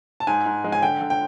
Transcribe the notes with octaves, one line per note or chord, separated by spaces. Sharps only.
A5
G#2 G#5
G#2
G#3
G#5
D3 G5
D3
G5